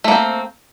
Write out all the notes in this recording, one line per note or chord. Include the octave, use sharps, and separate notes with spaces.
A3 A#3 C4